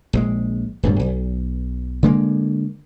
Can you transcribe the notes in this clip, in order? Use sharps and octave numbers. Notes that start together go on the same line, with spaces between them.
A#1 E3 G#3
D1 G2 B2
B1
D3 G#3 A#3